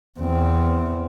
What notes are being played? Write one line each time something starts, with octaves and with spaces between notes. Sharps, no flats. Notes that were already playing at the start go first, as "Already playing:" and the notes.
E2 C4